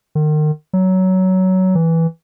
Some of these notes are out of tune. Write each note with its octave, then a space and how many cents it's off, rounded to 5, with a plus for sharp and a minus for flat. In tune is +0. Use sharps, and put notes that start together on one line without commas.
D#3 -35
F#3 +15
E3 -5